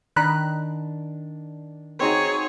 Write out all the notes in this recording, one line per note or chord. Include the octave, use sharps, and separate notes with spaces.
D#3 D4 A#5 B5 F#6
C4 D#4 F#4 G#4 C#5